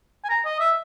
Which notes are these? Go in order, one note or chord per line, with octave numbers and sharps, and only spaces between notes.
G#5
A#5
D#5
E5